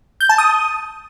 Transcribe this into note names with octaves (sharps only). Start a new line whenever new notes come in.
G6
A5
D#6